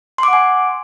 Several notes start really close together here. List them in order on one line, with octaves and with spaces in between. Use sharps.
C6 D6 F#5 G#5